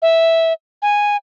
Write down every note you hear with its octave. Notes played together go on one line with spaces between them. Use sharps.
E5
G#5